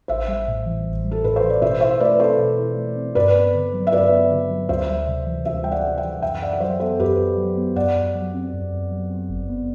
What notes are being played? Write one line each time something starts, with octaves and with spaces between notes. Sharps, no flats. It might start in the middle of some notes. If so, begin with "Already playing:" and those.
A1 C5 E5
G3
A2
E3
A1
G3
A4
A2 B4
C5
E3
D5
B2 C5 E5
E4 C5 E5
A3 B4 D5
C4 A4 C5
B2
E4
A3
C4
G2 B4 D5
B3
D3
F#3
E5
G2 B4 D5
B3
D3
F#3
D2 C5 E5
G3
C3
E3
D2 C5 E5
G3 G5
D5 F#5
C3
E5 G5
E3
F#2 E5 G5
F#2 D5 F#5
F#5
F#3 C5 E5
B3 A4 C5
F#2 G4 B4
F#2
F#3
B3
F#2 D5 F#5
F#2
F#3
C4
F#2
F#2
F#3
C4
G1
B3